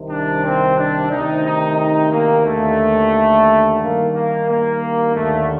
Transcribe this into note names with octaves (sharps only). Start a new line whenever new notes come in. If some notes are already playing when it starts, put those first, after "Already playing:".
Already playing: C2 C3 D#3
D4
C4
D4
D2 C3 D#3 D#4
D#4
D#4
A#3
D#2 D3 A3
G2 D#3 A#3
A#3
A#3
D#2 D3 A3